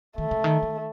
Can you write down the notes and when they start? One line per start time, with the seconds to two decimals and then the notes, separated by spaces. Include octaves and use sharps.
0.18 D#3 A3
0.31 C#3
0.44 D#3
0.63 D#3